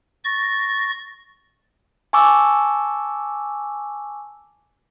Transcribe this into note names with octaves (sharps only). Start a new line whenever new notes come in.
C#6 A6 A#6
G#5 A5 C#6 D6 E6